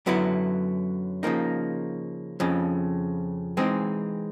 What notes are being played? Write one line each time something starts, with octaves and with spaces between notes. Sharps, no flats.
F#2 D3 F#3 B3 E4
C#3 F3 A#3 D#4
F2 C#3 F3
E3 G#3 C4 D#4